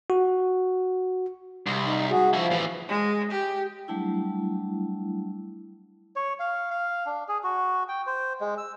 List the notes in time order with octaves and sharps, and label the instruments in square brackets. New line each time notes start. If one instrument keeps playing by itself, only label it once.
[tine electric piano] F#4
[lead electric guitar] C2
[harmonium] D#4
F#4 G#4
[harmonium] F3 [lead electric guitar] E4 F#4
[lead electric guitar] A2 E3
[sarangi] G#3
G4
[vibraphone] F#3 G3 A3 D4 E4
[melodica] C#5
F5
F5
D4
G#4
F#4
G5
C5
G#3
E6